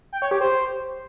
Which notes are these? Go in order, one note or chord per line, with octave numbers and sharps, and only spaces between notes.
G5
C#5
G4
C5